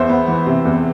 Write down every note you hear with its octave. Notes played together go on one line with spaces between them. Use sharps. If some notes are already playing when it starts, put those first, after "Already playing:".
Already playing: E2 C5 E5
B3
E3
C3
E2